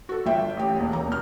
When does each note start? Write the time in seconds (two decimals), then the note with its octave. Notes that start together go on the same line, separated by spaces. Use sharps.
0.09 F#4 A4
0.26 G1 F4 E5 G5
0.57 A1 G4
0.77 E1 D#2
0.93 D#1 A#5
1.07 B2 F6